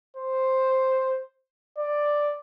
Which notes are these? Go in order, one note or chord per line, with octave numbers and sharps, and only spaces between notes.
C5
D5